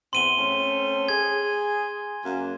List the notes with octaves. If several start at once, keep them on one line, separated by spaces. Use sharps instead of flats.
E2 C4 C6 D#7 G7
A3 C4 C#4
G#4 G#6
F#2 A#3